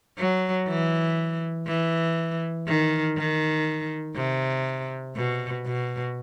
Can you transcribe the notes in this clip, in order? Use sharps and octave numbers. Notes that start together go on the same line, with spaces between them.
F#3
E3
E3
D#3
D#3
C3
B2
B2